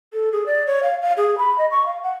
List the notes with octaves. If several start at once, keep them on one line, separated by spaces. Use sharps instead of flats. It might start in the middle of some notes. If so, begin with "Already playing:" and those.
A4
G#4
D5
C#5
F5
F5
G#4
B5
D#5
C#6
F5
F#5